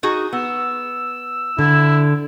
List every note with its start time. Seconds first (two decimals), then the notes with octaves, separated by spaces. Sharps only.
0.03 D#4 F#4 G#4
0.33 B3 E6
1.59 D3 E4